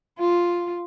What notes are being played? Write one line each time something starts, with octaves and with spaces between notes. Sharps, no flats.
F4